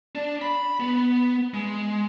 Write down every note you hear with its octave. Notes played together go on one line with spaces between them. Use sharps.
D4
B5
B3
G#3